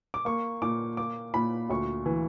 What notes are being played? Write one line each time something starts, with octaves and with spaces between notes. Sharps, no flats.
D6
A#3 C#6
A#2 D6
A#3 D6
A#2 B5
D2 C#6
E3